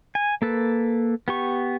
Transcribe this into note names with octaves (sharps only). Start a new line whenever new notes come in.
G#5
A#3 A4 B4
B3 G4 C#6